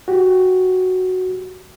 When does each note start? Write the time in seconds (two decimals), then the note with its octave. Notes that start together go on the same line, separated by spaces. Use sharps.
0.08 F#4 G4